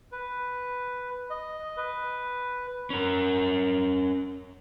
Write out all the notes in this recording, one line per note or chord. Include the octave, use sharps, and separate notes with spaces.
B4
D#5
B4
C#4 A#4